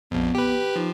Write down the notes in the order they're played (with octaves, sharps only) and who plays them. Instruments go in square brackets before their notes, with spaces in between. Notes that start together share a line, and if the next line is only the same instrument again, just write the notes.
[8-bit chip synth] A#1 F2 [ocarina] B3
[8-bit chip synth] G4 B4
[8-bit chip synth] F3 [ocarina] D#4